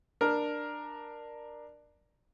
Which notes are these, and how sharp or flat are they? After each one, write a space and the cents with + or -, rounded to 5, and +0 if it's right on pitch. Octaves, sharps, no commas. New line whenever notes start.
D4 +20 A#4 +10